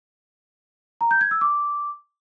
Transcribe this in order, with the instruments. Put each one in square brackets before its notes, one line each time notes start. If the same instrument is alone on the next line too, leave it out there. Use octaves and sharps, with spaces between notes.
[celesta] A#5
G6
G#6
E6
D6